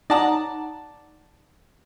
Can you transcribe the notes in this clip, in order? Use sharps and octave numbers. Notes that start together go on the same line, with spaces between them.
D#4 D5 F#5 A5 A#5